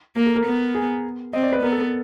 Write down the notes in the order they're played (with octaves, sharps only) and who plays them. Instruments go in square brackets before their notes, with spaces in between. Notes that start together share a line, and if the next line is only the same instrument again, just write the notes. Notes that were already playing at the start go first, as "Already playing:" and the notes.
[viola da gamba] A#3 [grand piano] A#4
[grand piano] A4
A#4
[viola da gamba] B3
[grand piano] G#4
[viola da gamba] C4 [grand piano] D#5
[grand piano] D5
B4
[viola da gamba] B3 [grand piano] A#4
[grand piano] A4
A4